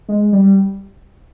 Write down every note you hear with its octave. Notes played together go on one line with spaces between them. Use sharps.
G#3
G3